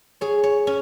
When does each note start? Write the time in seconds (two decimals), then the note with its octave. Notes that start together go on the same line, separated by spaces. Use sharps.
0.21 G#4 C#5
0.43 C#5
0.67 C#4